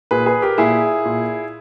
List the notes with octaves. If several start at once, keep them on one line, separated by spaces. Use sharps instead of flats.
A#2 G#4 B4
G#4 B4
G4 A#4
A#2 E4 G#4
A#2